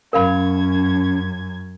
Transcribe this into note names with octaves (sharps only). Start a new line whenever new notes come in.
F#2 C#4 A#4 F5 B5 G#6